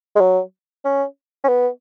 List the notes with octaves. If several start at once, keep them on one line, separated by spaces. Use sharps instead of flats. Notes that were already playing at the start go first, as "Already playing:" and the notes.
G#3
F#3
C#4
C#4
B3